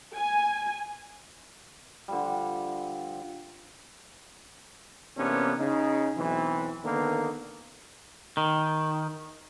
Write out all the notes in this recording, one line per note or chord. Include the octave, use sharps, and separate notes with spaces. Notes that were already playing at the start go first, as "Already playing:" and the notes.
G#5
D3 F3 G3
E2 C3 A#3 B3 C#4 D4
C#3 D#4
B1 E3 C4
D3 D#3 A#3 B3
D#3